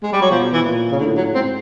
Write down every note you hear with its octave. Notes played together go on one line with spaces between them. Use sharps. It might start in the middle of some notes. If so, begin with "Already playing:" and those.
G#3
G3
F#3
B2 F3
E3
A#2
C#3
A2 D3
F#3
G#2 C4